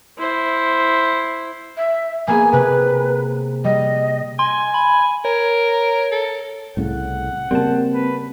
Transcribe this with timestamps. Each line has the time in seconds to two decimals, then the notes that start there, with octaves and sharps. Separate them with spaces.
0.18 E4 C5
1.77 E5
2.28 A#3 B3 G#4 G#5
2.53 C3 B4
3.64 G3 D#5
4.39 G#5 C6
4.74 B5
5.25 A#4 C#5
6.12 A4
6.77 C2 A2 C#3 F#5
7.51 C#3 G3 A#3 C4 A5
7.94 B4